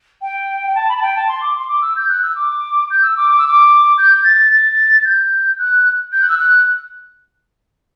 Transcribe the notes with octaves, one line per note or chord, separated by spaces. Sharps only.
G5
G5
A5
B5
A5
G5
A5
C6
D6
C6
D6
E6
G6
F#6
E6
D6
G6
E6
D6
D6
E6
D6
G6
A6
A6
A6
G6
F#6
G6
F#6
E6
F#6